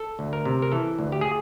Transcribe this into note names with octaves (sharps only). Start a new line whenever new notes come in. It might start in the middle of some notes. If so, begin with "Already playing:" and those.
Already playing: A4
D2
A#4
C3
A#4
E3 A4
D2
G4
G#4